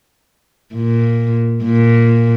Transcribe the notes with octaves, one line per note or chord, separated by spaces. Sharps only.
A#2
A#2